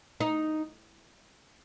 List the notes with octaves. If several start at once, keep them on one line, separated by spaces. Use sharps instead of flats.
D#4